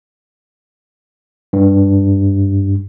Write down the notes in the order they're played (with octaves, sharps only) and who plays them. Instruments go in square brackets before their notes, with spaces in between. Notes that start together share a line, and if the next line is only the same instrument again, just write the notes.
[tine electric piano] G2